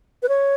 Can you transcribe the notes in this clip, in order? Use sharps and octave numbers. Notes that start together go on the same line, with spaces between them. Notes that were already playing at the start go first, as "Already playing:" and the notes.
B4
C#5